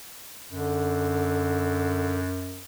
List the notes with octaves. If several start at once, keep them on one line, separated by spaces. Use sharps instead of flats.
F#2 D3